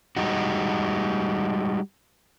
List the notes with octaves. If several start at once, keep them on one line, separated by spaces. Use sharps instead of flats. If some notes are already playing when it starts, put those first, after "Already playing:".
G3 G#3 D#4 F#4